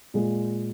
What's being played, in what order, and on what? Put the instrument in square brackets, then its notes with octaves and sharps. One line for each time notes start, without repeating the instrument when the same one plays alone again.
[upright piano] A#2 G#3